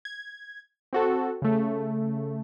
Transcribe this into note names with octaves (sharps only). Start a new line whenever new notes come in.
G#6
C4 F#4 A4
C#3 A3